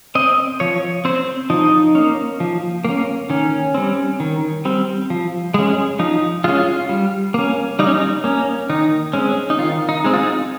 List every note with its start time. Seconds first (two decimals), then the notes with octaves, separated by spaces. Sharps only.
0.15 C4 D#5
0.60 F3 C#5
1.05 C4 C5
1.50 F3 D#4
1.95 A#3 C#4
2.40 F3
2.85 A#3 C#4
3.30 D#3 C#4
3.75 G3 C4
4.20 D#3
4.65 G3 C4
5.10 F3
5.54 G#3 C#4
5.99 F3 D#4
6.44 G#3 C#4 F4
6.89 G3
7.34 A#3 C#4
7.79 G3 D#4
7.87 C#4
7.94 D#4
8.24 A#3 C#4
8.69 D#3 D#4
9.13 G#3 C4 C#4
9.50 D#4
9.58 D#3 F4
9.89 D#4
10.05 G#3 C4
10.14 F4
10.19 D#4